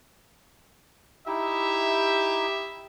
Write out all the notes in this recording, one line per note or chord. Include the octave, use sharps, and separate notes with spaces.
D#4 E4 G4 E5